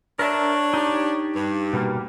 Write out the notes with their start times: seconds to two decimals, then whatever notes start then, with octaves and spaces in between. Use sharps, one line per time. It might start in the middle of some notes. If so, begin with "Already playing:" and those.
0.19 D4 A#4 C#5 E5
0.74 D#4 G4
1.35 G2
1.73 B2 G3 A#3